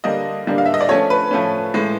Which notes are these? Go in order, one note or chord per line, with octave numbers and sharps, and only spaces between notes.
D3 G3 A#3 D4 D#5
D3 G3 A#3 D4
F5
E5
D#5
D5
F3 A3 C#4 C#5
B4
F3 A3 C#4
A2 E3 G#3